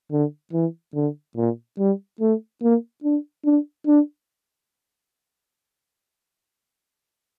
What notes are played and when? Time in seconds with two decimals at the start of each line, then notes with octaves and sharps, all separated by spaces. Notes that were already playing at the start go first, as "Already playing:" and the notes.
0.12 D3
0.53 E3
0.95 D3
1.36 A#2
1.79 G3
2.21 A3
2.62 A#3
3.04 D4
3.45 D4
3.87 D4